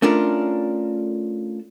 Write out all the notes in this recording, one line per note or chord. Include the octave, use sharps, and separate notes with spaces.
A3 C#4 D4 F4 A4 A#4